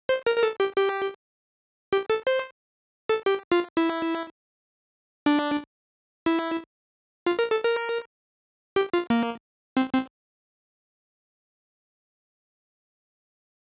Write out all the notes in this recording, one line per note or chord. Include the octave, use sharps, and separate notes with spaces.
C5
A#4
A#4
A4
G4
G4
G4
A4
C5
A4
G4
F4
E4
D4
E4
F4
A#4
A4
A#4
G4
F4
A#3
C4
C4